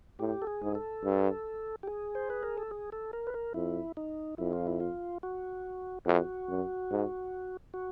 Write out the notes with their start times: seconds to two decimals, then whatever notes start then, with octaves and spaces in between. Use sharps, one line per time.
0.20 A2 G4
0.42 A4
0.47 G#4
0.62 G#2
0.75 A4
1.04 G2
1.83 G4
1.87 G#4
2.15 C5
2.30 B4
2.43 A#4
2.58 A4
2.71 G#4
2.92 A4
3.13 A#4
3.27 B4
3.34 A#4
3.54 F2 E4
3.97 D#4
4.38 F2 E4
4.53 F4
4.67 E4
4.80 F4
5.23 F#4
6.06 F2 F#4
6.49 F#2
6.91 G#2
7.74 F#4